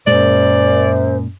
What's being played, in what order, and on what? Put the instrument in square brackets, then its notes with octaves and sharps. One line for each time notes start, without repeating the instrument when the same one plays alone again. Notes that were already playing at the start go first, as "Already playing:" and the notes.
[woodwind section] F#2 [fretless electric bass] A#2 G#3 [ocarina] C5 [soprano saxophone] D5